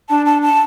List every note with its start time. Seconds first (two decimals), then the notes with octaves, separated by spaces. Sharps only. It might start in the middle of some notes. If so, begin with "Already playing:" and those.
0.09 D4 A5
0.26 A5
0.42 A5